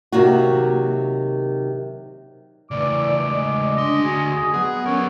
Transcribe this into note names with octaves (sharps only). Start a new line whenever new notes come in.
C3 D#3 F#3 A#3 F#4
C#3 E3 A3 D5 D6
G#3
D2 D4 D#5 C6
F#4 G#4
F#3 B3 G#4
G3 C#4 A#4 C#5